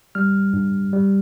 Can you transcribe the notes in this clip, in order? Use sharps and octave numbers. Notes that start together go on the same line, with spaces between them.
G3 F6
G2
G3